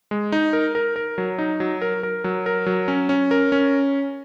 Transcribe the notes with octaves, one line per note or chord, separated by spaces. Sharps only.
G#3
D#4
A#4
A#4
A#4
F#3
D#4
F#3
A#4
A#4
F#3
A#4
F#3
C#4
C#4
A#4
C#4